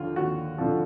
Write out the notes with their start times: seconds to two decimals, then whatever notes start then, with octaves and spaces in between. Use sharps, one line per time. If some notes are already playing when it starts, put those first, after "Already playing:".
Already playing: D#2 D3 F3 F4
0.16 D#2 F#4
0.58 D3 F3